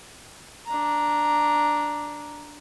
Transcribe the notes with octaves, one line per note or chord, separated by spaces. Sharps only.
D4 A#5